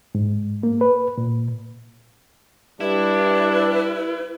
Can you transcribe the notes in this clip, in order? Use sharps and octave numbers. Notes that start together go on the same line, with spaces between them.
G#2
A#3
B4
A#2
G3 D4 E4 B4